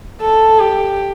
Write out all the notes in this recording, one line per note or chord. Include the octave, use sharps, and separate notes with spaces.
A4
G4